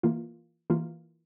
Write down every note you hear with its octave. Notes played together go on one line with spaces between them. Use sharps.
E3 A#3 F4
E3 A#3 F4